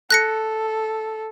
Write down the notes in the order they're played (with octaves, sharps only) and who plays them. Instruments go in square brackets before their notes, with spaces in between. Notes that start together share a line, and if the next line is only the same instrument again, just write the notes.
[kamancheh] A4 [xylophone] F#6 A#6 C#7